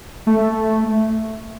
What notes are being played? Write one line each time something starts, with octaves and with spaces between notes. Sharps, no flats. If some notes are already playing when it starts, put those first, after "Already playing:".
A3